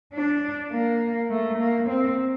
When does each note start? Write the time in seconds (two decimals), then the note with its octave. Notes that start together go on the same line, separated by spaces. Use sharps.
0.14 D4
0.72 A#3
1.30 A3
1.59 A#3
1.89 C4